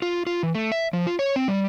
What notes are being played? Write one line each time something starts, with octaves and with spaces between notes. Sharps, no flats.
F4
F4
E3
A3
E5
F3
F4
C#5
C4
G3